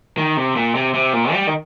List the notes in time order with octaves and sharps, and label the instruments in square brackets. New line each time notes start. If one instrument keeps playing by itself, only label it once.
[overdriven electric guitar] D#3
C3
A#2
C3
C3
A#2
G3
D#3